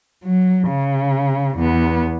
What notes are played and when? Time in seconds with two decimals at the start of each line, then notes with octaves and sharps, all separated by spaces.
0.24 F#3
0.68 C#3
1.58 E2 B3